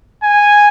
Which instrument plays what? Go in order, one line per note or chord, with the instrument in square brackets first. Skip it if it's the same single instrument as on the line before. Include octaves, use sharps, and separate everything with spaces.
[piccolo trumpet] G#5